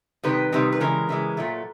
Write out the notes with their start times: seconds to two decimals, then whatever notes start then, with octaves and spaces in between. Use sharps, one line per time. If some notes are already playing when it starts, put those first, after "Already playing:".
0.23 C3 D#3 G3 B4
0.52 C3 D#3 G3
0.72 B4
0.80 C#3 E3 G#3 A#4
1.09 C#3 E3 G#3
1.37 A#2 F#3 A3